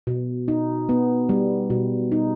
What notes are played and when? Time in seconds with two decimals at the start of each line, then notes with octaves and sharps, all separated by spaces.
0.07 B2
0.48 D#4
0.89 B3
1.29 G3
1.70 B2
2.12 D#4